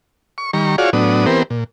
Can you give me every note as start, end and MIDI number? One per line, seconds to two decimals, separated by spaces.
0.38 0.51 85
0.53 0.76 51
0.53 0.76 55
0.53 0.76 82
0.53 0.76 85
0.78 0.90 65
0.78 0.90 66
0.78 0.90 68
0.78 0.90 73
0.78 0.90 74
0.78 0.90 77
0.93 1.26 45
0.93 1.26 54
0.93 1.26 59
0.93 1.26 62
0.93 1.26 87
1.26 1.43 52
1.26 1.43 59
1.26 1.43 60
1.26 1.43 67
1.26 1.43 70
1.26 1.43 72
1.50 1.64 46